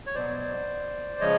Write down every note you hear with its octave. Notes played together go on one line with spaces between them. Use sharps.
C#5
B2 F#3 B3 C5 D5
C#3 F3 G#3 C#5 D#5